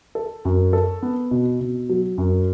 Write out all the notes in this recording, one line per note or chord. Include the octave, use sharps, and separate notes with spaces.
A4
F#2
A4
B3
B2
B2
F#3
F#2